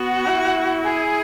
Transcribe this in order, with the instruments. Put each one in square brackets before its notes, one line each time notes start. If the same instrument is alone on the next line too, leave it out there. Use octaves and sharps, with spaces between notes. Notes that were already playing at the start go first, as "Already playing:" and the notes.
Already playing: [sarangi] B3 [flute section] F#4
[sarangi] E4
[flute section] G#4